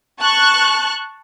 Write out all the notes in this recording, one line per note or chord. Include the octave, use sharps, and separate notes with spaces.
A5 C#6 F#6